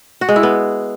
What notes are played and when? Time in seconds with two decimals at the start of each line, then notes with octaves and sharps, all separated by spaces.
0.21 F#4
0.29 G#3
0.36 E4
0.43 B3